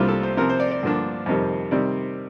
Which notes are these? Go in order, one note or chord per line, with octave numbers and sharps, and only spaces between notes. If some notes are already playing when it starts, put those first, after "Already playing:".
Already playing: C2 C3 G3 A#3 D4 F4
A4
C5
C3 F3 C4 A#4
C5
D5
D5
G2 D3 F3 A#3 D4
F2 C3 D#3 G3
C3 D#3 G3 C4 D5